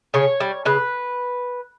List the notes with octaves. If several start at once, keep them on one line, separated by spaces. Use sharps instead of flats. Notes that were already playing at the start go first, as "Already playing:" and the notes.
C#3 C#5
G3
C#3 B4